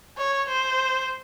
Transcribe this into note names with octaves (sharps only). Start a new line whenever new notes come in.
C#5
C5